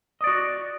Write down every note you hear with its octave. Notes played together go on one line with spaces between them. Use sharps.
F#4 D5 D#5